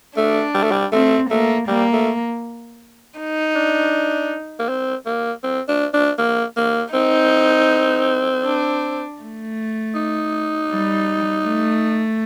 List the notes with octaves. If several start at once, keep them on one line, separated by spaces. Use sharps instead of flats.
A3 D4
G3
A3
G3
A3 C4
A3 A#3
G3 A#3
A3
D#4
D4
A#3
C4
A#3
C4
D4
D4
A#3
A#3
C4 D#4
D4
A3
D#4
G3
A3